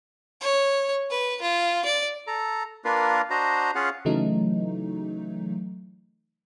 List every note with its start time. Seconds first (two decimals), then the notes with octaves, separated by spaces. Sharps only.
0.41 C#5
1.10 B4
1.42 F4
1.85 D5
2.27 A4 A#5
2.85 A#3 D4 F4 A#4 B4 F5
3.30 D4 F#4 C5 D#5 A#5
3.75 C#4 F4 G#4 F5 F#5
4.05 C#3 E3 F#3 A3 D#4